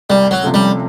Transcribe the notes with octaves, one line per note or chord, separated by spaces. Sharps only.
C2 G3
F#3
C3 F3 A3 C#4
G3